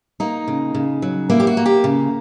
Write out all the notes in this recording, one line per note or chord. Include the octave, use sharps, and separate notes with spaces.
A#3 D#4
C#3
C#3
F#3
A#3 E4
G4
F#4
A#3
G4
C#3